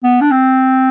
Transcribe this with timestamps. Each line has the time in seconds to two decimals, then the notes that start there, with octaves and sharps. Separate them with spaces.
0.03 B3
0.21 D4
0.31 C4